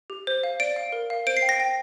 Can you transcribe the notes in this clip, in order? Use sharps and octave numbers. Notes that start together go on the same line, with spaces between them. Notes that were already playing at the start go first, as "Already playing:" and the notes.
G4
C5
F5
D5 D7
F5
A#4
F5
C5 D7
C7
G5
A#6
G5